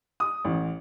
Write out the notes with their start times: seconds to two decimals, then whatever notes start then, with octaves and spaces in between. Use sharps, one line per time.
0.20 D#6
0.45 A1